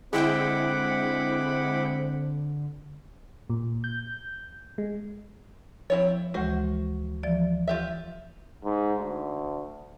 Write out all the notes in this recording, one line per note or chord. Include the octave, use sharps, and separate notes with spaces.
D3 G#3 C4 E4 F#5 G5 B5 D6
A#2
G6
G#3
F3 C4 E4 C#5
D2 E3 G#3 F#4 C5
E3 F3 D5
F4 G4 E5
G#2
D2